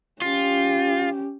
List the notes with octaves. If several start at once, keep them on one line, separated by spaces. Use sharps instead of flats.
C#4 F4 G4